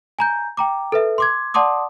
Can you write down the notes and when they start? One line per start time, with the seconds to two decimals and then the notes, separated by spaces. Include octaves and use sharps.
0.19 G#5 A#5 G6
0.57 G5 A#5 D6
0.92 A4 B4 E5
1.18 C6 D6 G#6
1.54 D5 F#5 A5 C6 D6 D#6